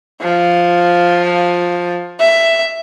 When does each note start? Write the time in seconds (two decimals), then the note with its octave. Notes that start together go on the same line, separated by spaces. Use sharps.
0.22 F3
2.20 E5